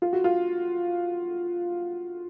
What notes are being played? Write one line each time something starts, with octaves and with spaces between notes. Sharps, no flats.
F4
F#4
F4